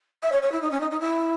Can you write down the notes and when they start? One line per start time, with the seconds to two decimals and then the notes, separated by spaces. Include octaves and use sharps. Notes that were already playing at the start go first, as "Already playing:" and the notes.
0.23 E5
0.32 C#5
0.42 C#5
0.51 E4
0.61 D#4
0.71 C#4
0.80 D#4
0.90 D#4
1.00 E4